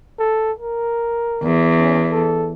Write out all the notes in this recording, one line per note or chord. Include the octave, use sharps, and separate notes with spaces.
A4
A#4
E2
C#4
A4